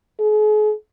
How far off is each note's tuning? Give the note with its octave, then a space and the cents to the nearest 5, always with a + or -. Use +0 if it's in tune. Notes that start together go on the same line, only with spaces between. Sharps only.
G#4 +40